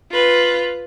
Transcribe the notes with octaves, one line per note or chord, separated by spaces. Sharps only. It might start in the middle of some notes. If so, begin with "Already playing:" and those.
F4 B4